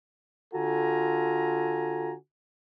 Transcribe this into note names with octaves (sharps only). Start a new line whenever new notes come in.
D3 F4 F#4 A4 G#5 A#5